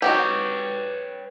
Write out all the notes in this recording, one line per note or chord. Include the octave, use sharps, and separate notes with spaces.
D#4 F#4 G4 B4 C#5 G5